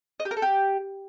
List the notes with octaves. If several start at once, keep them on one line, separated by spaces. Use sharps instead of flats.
D#5
G4
A#4
A4
G4